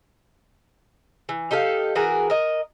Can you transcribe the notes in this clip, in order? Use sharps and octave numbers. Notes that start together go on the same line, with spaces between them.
E3
D#4 G4 A4 F5
E3 F#4 G#4 A#4
A#4 D#5